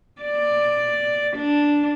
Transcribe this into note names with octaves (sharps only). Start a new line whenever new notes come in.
D5
D4